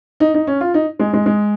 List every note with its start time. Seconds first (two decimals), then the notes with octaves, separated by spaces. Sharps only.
0.20 D#4
0.34 D#4
0.47 C#4
0.61 F4
0.74 D#4
0.99 G#3
1.13 G#3
1.26 G#3